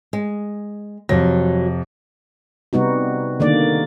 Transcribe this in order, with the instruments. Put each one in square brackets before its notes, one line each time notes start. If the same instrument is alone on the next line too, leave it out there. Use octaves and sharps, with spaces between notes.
[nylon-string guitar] G#3
[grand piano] F2 C3 A#6 [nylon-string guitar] F#3
[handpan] C3 G3 B3 D#4 F#4
D3 D#3 A#3 D5